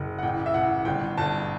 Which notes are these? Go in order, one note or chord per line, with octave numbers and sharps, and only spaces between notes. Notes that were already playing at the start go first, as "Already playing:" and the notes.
Already playing: F#1
F#5
A1 G5
E5
A1 F#5
G1 G5
G1 A5